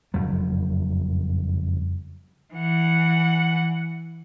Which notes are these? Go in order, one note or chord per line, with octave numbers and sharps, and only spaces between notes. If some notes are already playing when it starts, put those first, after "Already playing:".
F#1 F2 F#3 G3
E3 F#5